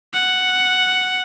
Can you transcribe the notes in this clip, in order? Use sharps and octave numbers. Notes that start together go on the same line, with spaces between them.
F#5